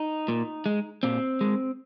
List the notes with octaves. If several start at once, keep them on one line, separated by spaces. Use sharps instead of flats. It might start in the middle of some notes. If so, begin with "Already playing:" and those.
Already playing: D#4
A#2
G#3
A#2 C4
G#3